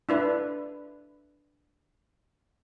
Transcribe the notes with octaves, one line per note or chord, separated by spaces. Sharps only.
D4 E4 B4